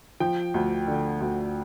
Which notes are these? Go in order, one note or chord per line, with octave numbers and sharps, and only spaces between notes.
F3 G5
D2
D3
D2